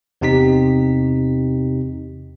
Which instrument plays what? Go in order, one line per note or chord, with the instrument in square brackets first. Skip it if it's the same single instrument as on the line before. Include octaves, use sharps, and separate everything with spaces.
[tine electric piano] E2 C3 C4 D#4 G4 B6